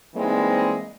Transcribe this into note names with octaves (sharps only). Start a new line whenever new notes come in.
E3 G3 G#3 A#3 C4 D#4